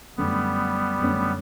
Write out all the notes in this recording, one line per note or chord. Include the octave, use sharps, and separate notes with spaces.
F#2 D3 G3 A3 B3 C#4
F#2 D3 A3 C#4